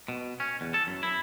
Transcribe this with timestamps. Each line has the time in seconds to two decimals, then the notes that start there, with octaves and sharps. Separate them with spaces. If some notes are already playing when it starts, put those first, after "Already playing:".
0.08 B2
0.40 C#4
0.61 E2
0.74 A4
0.87 F#2
1.03 E4